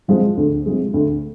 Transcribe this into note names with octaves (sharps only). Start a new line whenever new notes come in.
C3 F3 G#3
D2
C3 F3 G#3
D2